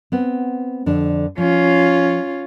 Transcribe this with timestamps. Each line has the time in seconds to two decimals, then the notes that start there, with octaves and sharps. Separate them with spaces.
0.12 B3 C4
0.86 F2 D3 D4
1.38 F3 C#4 F4